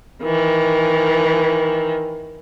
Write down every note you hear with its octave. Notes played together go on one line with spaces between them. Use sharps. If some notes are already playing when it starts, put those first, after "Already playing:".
D#3 E3